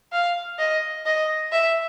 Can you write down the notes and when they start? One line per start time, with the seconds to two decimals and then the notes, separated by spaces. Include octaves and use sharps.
0.12 F5
0.59 D#5
1.06 D#5
1.52 E5